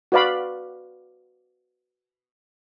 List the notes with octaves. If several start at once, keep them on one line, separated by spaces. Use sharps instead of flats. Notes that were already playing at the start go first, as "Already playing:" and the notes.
F#4 B4 D5 F5 B5